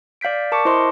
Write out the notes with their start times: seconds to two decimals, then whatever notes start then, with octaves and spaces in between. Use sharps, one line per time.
0.21 D5 F5 G6 B6 D7
0.52 A#4 A5 C#6 D6 C#7
0.65 E4 C5 D#5 C6